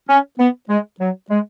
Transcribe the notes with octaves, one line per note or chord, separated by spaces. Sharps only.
C#4
B3
G#3
F#3
G#3